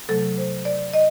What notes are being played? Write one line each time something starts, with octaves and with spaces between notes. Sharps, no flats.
C3 F#3 A3 A4
C5
D5
D#5